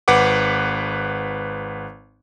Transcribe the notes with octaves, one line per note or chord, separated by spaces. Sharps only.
G#1 B4 F#5 D6